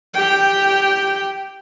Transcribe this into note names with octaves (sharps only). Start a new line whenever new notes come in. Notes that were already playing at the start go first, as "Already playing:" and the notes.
G4 G5